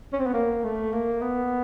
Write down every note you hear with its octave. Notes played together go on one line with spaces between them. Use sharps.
C#4
C4
B3
A#3
A3
A#3
B3